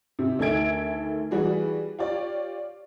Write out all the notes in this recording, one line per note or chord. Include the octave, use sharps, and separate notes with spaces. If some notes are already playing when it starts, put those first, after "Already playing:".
C3
D2 D#3 A4 E5 G#6 D7
E3 G3 F#4 G#4
F4 G4 C#5 D5